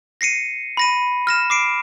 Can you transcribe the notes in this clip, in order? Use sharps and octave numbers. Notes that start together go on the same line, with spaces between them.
A#6 C7 C#7 D#7
B5 A#6 D#7
F6 A#6 E7
D6 C7 D7